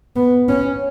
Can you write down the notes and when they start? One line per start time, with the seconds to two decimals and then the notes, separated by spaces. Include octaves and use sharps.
0.16 B3
0.49 C#4